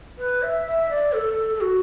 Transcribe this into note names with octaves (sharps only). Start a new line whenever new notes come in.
B4
E5
E5
D5
A4
A4
F#4